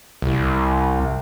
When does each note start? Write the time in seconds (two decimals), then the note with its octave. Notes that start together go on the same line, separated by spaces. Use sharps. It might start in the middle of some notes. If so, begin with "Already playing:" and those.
0.22 C2